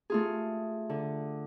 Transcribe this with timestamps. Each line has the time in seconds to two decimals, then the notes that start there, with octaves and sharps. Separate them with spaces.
0.10 A3 F4 G#4
0.90 D3